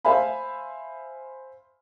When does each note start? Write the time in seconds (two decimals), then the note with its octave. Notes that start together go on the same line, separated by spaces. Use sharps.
0.05 C5 E5 F5 G#5 B5